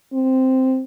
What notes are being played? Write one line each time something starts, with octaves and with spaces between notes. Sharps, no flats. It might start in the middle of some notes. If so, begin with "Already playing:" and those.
C4